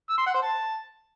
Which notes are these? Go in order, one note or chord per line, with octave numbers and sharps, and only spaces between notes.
E6
C6
F#5
C5
A5